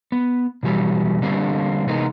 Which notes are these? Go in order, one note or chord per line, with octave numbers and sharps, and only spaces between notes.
B3
B2 E3 F#3 G3
D3 G3 A#3 C4 D4
C3 E3 G#3 B3 D#4 A#4